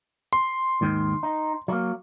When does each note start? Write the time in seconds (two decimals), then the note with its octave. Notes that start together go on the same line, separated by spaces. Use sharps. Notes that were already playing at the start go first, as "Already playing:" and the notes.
0.33 C6
0.81 D#2 G#2 D#3
1.23 D#4
1.68 F#3 A#3